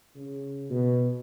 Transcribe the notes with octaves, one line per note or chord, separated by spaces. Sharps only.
C#3
B2